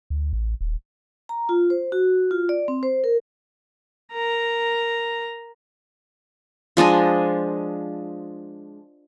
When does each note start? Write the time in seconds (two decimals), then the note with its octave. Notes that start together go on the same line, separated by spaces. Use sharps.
0.10 D2
0.33 A1
0.61 D#1
1.29 A#5
1.49 F4
1.70 C5
1.92 F#4
2.31 F4
2.49 D5
2.68 C4
2.83 C5
3.04 A#4
4.13 A#4 A#5
6.77 F3 G#3 D4 D#5